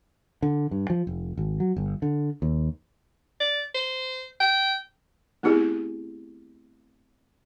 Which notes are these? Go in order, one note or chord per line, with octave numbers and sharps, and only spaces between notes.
D3
G2
F3
F1
G#1
F#3
G1
D3
D#2
D5
C5
G5
A3 B3 C4 E4 G4 G#4